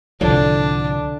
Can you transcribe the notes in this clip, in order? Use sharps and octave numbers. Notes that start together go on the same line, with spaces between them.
C2 A2 D3 F3 D4